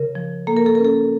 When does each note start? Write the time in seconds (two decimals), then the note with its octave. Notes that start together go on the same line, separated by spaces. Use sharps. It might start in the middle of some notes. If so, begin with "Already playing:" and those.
Already playing: C#3 A#4
0.15 F3
0.47 A#3 A4
0.57 A#4
0.66 A4
0.75 C#4 A#4
0.85 A4